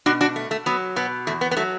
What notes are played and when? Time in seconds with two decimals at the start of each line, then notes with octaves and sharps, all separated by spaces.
0.06 B2 D4 F#4
0.21 D4 F#4
0.36 A3
0.51 A3
0.66 F#3 B3
0.96 B2 B3
1.27 E2 A3
1.41 B3
1.51 B3
1.57 F#3 A3